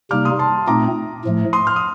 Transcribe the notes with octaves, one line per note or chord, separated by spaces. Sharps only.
C3 G3 A#3 D#4 D6 F6
C6 D#6
A5 C6
A#2 A3 C4 D#4 A#5 D6
A2 F3 A3
C6 D#6
F6
D#6